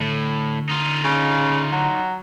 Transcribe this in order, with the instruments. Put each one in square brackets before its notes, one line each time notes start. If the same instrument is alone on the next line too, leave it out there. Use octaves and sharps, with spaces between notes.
[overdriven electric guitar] A2 [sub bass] D3
[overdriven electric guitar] D#4 F4
[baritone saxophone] C#3
F#3